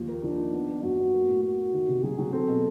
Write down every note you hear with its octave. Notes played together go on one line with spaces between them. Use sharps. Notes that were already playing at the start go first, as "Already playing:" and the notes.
Already playing: D#2 F3
A#3
F3 D4
D#4
B3
B3
F#2 F#4
B3
A#3
A2
A#3 F#4
A#3
D#3
C3
F#3 G#4
F#3
C4 A4
B2